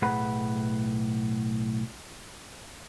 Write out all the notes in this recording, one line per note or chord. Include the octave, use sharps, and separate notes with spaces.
B1 A2 G#4 B4 F#5 B5